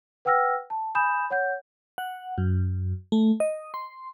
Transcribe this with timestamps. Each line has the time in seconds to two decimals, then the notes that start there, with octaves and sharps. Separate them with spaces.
0.25 B4 F#5 G5 E6 F6 A#6
0.70 A5
0.95 G#5 B5 D#6 G6 E7
1.30 C#5 F#5 G6
1.98 F#5
2.38 F#2
3.12 A3
3.40 D#5
3.74 C6